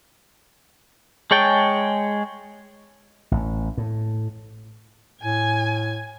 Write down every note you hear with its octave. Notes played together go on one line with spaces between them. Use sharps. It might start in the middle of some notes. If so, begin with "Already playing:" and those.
G#3 G#4 C#5 G5 A5
A1
A2
A2 G#5